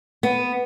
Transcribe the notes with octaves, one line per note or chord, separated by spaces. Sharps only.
B3